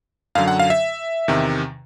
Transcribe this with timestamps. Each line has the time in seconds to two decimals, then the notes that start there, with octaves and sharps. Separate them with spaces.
0.35 F#2 D3 F#3 F5
0.48 F#5
0.59 F5
0.70 E5
1.28 E2 C3 D#3